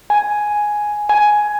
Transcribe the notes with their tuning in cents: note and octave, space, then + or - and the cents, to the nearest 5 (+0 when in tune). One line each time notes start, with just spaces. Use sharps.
G#5 +5
G#5 +10